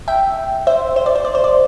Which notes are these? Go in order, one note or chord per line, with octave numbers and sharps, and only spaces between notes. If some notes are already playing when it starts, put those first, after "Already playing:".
E5 G5
C5 E5
C5
D5
C5
D5
C5
D5